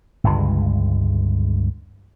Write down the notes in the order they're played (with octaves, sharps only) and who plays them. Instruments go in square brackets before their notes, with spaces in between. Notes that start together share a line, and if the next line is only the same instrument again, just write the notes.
[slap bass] G1 C#2 G2 G#3